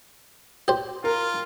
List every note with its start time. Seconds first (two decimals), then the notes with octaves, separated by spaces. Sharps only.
0.68 G4 C5
1.04 F4 A#4